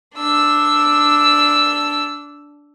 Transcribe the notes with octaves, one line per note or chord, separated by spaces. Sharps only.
D4 E6